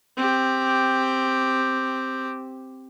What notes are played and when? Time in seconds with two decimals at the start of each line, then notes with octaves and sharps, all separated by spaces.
0.17 C4 G4